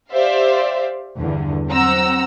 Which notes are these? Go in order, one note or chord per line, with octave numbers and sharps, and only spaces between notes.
G4 C5 D5 E5 F5
E2 G2 D3
F#3 C4 F#5 A#5 E6